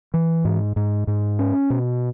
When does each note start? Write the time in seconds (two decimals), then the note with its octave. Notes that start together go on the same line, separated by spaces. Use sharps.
0.14 E3
0.45 G#2
0.76 G#2
1.07 G#2
1.39 C#4
1.70 B2